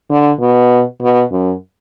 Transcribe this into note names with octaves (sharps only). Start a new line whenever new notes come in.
D3
B2
B2
F#2